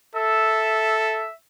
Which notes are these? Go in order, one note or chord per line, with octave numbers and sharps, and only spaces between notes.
A4 E5